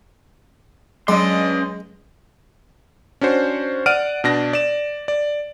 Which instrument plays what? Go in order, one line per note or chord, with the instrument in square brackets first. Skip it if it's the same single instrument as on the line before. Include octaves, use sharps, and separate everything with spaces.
[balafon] F#3 [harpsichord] G#3 [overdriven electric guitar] C#4 C6 [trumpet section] D4 D#5
[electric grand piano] C#4 D4 F#4 C5
D5 F#5 F6 D7 D#7
B2 D4 A#6
D5 E7
D5